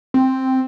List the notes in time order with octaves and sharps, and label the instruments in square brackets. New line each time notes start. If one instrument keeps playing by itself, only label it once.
[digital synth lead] C4